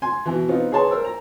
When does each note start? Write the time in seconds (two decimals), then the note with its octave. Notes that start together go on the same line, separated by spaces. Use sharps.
0.02 G#5 C6
0.26 B2 E3
0.48 B3 C4 D#4 F4
0.72 G#4 B4 C#5 A5 C6
0.91 A#4 C5 E6
1.04 A#5